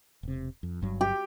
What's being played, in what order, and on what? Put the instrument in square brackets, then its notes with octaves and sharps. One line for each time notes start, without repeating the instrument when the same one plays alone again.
[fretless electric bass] E1 C3
F2
G1 G2 F#3
[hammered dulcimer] G4